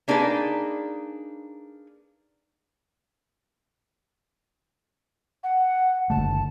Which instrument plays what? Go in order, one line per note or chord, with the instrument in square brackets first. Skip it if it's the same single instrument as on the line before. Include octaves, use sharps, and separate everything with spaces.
[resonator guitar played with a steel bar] A#3 D4 D#4 G#4 B4
[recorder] F#5
[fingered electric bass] F#1 D3 A3 [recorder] A5